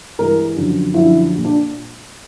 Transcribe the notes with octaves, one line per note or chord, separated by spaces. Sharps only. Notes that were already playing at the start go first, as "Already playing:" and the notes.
G2 E3 G#3 A#4
F#2 D3 F3
F#2 D3 F3 E4
A#2 G3
D4